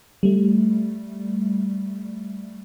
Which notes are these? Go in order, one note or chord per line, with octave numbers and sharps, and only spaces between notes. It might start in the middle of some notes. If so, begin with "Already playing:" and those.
G3 A3